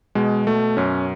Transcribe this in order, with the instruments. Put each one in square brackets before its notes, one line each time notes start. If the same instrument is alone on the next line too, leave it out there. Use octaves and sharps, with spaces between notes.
[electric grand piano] B2 G#3
B2 A3
F#2 C#4